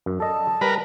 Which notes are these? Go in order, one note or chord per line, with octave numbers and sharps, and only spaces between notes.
F#2
A4 D5 D#5 A5
G3 A#4 B4